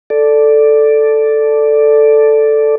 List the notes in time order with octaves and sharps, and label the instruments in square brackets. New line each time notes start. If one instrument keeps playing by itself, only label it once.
[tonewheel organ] A4 D5